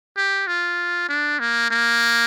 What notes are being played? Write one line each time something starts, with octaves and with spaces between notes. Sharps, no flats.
G4
F4
D4
A#3
A#3